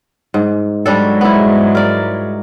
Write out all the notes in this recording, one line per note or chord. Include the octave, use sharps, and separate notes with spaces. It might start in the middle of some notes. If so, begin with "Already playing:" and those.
G#2
G#2 F#3 G3 D4 A4
B3 E4
A#4 D5